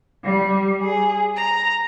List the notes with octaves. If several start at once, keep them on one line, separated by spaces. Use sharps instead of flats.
G3
G#4
A#5